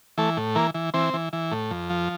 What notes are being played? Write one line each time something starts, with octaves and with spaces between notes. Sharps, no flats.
E3 A3
A2
E3 A#3
E3
E3 C4
E3
E3
A2
F2
F3